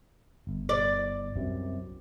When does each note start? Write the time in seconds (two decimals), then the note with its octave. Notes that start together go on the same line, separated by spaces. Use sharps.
0.47 G1
0.69 D5
1.36 C2 F#2 C3